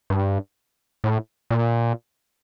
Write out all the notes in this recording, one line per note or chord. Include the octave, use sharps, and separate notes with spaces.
G2
A2
A#2